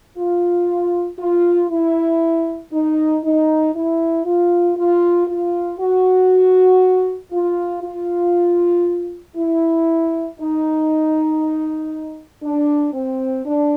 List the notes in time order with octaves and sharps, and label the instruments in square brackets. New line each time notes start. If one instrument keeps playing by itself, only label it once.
[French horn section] F4
F4
E4
D#4
D#4
E4
F4
F4
F4
F#4
F4
F4
E4
D#4
D4
C4
D4